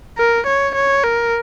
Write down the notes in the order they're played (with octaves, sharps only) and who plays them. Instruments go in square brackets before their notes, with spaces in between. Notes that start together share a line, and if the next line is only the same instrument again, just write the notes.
[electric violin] A#4
C#5
C#5
A#4